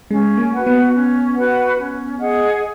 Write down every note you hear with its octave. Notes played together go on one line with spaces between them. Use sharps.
G#3 C#4
A#3
F#4 B4 F#5
B3
C#4
F#4 B4 F#5
C#4
G#4 D#5 F#5